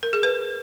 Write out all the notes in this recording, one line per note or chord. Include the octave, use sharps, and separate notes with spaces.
A#4
G#4
B4